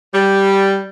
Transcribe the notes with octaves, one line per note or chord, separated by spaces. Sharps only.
G3